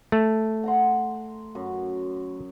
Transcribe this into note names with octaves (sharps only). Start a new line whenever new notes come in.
A3
F#5 A#5 C6
F#2